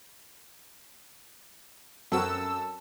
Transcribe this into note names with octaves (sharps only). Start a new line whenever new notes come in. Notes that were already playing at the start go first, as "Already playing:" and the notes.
F#2 C4 F#4 A4 A#4 A5 E6